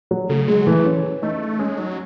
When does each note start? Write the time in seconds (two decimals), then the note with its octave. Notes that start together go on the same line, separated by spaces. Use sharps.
0.11 F#3
0.29 C#3 A3
0.48 F#3 G#3
0.67 E3 A3
0.85 C#4
1.22 A3 D#4
1.59 G#3 C#4
1.78 F#3 D#4